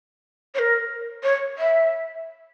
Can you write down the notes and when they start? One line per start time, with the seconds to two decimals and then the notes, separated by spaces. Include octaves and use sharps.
0.54 C#5
0.59 A#4
1.23 C#5
1.58 E5